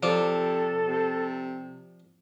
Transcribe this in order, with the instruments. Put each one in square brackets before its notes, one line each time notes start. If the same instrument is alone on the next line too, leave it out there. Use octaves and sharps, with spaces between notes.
[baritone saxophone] C3 [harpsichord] F3 D5 [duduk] A4
[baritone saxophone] C3